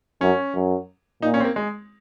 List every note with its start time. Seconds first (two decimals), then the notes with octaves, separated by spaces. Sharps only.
0.21 F#2 C#4
0.55 F#2
1.22 A#2 D#4
1.34 C#4
1.40 C4
1.44 A#3
1.56 G#3